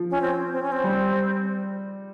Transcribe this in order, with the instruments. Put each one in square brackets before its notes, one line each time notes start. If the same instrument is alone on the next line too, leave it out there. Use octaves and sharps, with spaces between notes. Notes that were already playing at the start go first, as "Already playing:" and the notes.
Already playing: [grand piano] F3
[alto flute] C#4
C4
C4
C#4
C4
[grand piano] G3